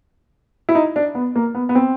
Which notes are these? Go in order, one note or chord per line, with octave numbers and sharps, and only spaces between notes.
E4
D#4
D4
B3
A#3
B3
B3
C4